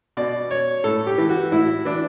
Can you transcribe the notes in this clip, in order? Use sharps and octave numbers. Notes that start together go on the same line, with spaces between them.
B2 D5
C#5
A2 A4
G4
E3
F#4
A2 E4
E3 D4